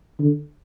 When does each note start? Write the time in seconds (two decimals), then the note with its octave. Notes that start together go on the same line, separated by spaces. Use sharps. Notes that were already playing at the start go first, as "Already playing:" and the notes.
0.19 D3